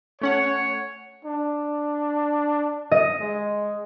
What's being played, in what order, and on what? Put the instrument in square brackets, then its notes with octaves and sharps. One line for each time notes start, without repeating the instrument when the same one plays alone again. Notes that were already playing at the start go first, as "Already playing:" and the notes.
[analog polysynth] A3 C#4 F#5 [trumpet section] C#5
[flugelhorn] D4
[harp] D#5
[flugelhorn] G#3